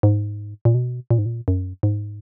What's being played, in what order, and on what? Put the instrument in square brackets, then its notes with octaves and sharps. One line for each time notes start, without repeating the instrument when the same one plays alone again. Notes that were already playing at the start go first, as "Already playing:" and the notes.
[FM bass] G#2
A#2
B2
A#2
G#2
A#2
F#2
G#2